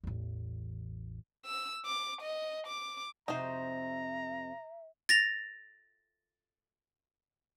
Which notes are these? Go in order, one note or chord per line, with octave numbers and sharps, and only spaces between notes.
A1 E2
E6
D6
D#5
D6
F2 C3 D#4 F#4 C5 E5 A#5
A6 A#6 F7